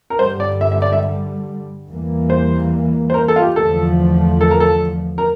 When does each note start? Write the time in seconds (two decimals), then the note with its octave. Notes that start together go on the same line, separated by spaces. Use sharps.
0.10 A#4
0.19 G2 D3 G3 C5
0.40 D5
0.61 E5
0.72 E5
0.82 D5
0.93 E5
1.88 E2 E3 G3 A#3
2.30 C5
3.10 C5
3.14 A#4
3.28 A4
3.36 F4
3.42 G4
3.56 E2 D3 F3 A3 A4
4.41 A4
4.51 A#4
4.60 A4
5.18 A#4